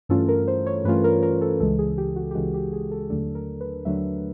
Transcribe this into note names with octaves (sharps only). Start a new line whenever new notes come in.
G2 E3 A3 C#4 F4 A4
A#4
C5
C#5
G2 E3 A3 C#4 F4 B4
A#4
A#4
A4
C#2 C#3 E3 G#3 A4
G#4
G4
F#4
G4
C#2 C#3 E3 G#3 F#4
G4
G#4
A4
D#2 D3 F#3 A3 D4 A4
A#4
B4
D#2 D3 F#3 A3 D4 E5